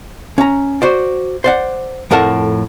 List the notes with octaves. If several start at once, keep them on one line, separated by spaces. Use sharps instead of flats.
C#4 A#5
F#4 C5 D5
C5 D5 F#5
F2 A2 A#4 F#5 A5